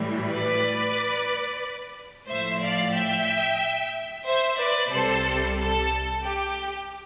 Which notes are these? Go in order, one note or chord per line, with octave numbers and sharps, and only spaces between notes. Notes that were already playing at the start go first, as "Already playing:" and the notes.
Already playing: A2 E3 G3
B4 D5
A2 F3 C5 E5
D5 F5
E5 G5
C5 E5
B4 D5
C2 C3 G3 A4 C5
A4
G4